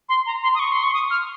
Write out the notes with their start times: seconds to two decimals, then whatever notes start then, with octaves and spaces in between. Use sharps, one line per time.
0.09 C6
0.26 A#5
0.43 C6
0.55 D#6
0.59 C#6
0.72 C6
0.83 C#6
0.94 D#6
1.10 F6